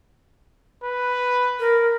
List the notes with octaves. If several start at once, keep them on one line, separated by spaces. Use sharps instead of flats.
B4
A#4